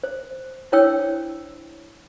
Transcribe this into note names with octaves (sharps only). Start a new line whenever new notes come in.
C5
D4 E4 C5 C#5 G5 E6